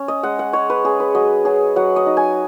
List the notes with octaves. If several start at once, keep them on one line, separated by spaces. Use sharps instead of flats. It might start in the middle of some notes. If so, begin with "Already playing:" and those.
Already playing: C#4
D#5
G#3 F#5
F#5
G#3 C#5
B4
C#4 G#4
B4
F#3 D#5
F#3 G#4
F#3 F#5
D#5
D#4
G#5